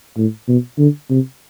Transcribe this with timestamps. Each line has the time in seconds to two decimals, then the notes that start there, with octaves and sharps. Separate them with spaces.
0.17 A2
0.48 B2
0.78 D3
1.10 C3